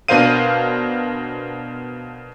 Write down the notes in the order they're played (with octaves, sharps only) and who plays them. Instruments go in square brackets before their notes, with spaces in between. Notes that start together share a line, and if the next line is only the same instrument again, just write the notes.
[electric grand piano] B2 D4 A#4 C5 F5 D#7